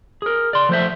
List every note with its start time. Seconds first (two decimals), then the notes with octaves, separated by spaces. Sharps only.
0.22 G#4 A#4
0.53 D5 C6
0.69 F3 A3 C5 E5